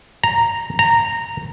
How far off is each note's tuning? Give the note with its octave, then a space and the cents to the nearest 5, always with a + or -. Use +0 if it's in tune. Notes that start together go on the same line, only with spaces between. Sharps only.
A#5 -5
A#5 -15